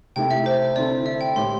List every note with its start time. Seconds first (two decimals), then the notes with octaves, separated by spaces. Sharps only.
0.16 C3 A3 E4 A4 G5
0.31 E5
0.46 C5
0.76 D3 C4 E4 A4 D5
1.06 E5
1.21 G5
1.36 A2 A3 E4 G4 C6